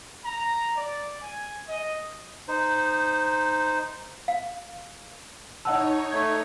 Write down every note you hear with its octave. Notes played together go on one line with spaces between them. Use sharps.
A#5
D5
G#5
D#5
D#4 C5
F5
D#4 C#5 D#5 F#5 A5 E6
A3 G#6